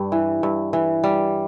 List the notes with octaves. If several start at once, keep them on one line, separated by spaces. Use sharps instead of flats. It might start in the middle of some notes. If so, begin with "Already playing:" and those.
Already playing: G2 G3
E3
G2
E3
G3